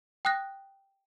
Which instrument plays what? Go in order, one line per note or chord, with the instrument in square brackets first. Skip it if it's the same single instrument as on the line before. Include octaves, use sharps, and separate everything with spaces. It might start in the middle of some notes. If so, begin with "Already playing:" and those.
[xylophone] G5 D#6 F#6 A#6